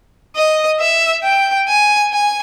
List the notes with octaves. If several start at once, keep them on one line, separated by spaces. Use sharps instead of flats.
D#5
E5
G5
G#5
G#5